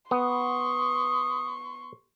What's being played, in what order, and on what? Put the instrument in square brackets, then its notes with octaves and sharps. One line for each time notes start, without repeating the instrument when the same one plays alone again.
[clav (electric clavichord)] B3 [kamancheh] C6 C#6 [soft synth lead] D#6